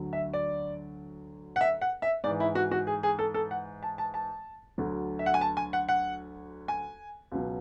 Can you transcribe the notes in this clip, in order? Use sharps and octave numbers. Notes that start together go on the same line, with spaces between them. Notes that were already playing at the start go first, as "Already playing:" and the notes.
Already playing: D2 D3 F#3
E5
D5
F#5
E5
F#5
E5
G#2 E3 D5
E4
F#4
F#4
G#4
G#4
A4
A4
F#5
A5
A5
A5
D2 D3 F#3
E5
F#5
G#5
A5
G#5
F#5
F#5
G#5
C#2 B2 F#3